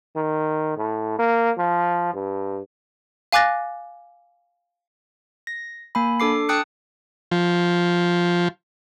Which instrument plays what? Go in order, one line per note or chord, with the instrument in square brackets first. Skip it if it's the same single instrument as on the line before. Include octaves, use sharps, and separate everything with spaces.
[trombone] D#3
A2
A#3
F3
G2
[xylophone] F5 G#5 D6 F#6 A6 A#6
[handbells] A#6
A#3 G#5 B5
D4 A4 D6 C7
G5 A5 D#6 F#6 C#7
[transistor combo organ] F3